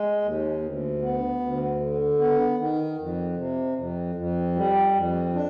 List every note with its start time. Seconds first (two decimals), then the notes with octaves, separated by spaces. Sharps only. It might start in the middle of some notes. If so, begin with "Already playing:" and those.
Already playing: G#3
0.22 D#2
0.62 D2
1.01 B3
1.40 D2
1.80 D3
2.19 B3
2.59 D#3
2.98 F2
3.37 C3
3.76 F2
4.15 F2
4.55 G3
4.94 F2
5.34 D4